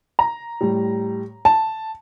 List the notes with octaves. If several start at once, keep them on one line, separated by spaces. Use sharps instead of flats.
A#5
A2 G3
A5